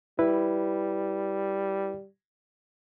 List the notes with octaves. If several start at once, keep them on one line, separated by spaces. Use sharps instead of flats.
G3 E4 B4